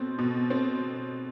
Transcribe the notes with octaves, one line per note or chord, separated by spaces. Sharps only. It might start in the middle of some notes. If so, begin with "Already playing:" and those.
Already playing: B2 C4
B2
C4